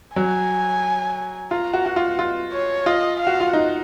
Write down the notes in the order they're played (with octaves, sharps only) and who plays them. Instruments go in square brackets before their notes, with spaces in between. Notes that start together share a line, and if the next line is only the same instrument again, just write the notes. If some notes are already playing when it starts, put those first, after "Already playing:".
[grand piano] F#3 [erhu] G#5
[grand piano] F4 [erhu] A#5
[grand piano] F#4
[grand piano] F#4 [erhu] F#5
[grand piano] F4
F4
[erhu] C#5
[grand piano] F4 [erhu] D#5
[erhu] F5
[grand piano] F#4
F4
[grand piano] D#4 [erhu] F#5